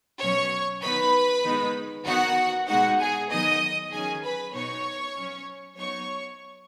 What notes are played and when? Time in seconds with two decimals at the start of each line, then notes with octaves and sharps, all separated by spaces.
0.20 B2 F#3 C#4 C#5 C#6
0.83 D#3 B3 D#4 B4 B5
1.44 D#3 G#3 B3 D#4
2.06 D#3 B3 D#4 F#4 F#5
2.68 B2 G#3 D#4 F#4 F#5
2.99 G#4 G#5
3.29 D#3 F#3 B3 D#4 D#5 D#6
3.91 D#3 F#3 C#4 G#4 G#5
4.23 B4 B5
4.53 B2 B3 D#4 C#5 C#6
5.16 F#3 C#4
5.77 F#3 B3 D#4 C#5 C#6